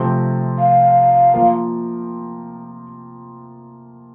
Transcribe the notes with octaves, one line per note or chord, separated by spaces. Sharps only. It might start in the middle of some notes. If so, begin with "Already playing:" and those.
Already playing: C3 F3 A3 C4
F5
F3 A#3 F4 A#4